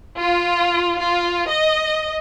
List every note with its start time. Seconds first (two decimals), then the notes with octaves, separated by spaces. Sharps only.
0.18 F4
1.00 F4
1.50 D#5